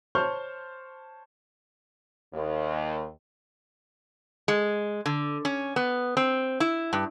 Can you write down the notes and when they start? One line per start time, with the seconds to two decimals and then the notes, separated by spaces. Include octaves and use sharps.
0.15 C5 C#5 A5 C#6 F6 G6
2.34 D#2
4.48 G#3
5.06 D3
5.45 C#4
5.76 B3
6.17 C4
6.60 E4
6.93 G2